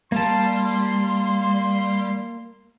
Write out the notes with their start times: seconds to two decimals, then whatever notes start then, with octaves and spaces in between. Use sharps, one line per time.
0.12 G3 A#3 A5 C6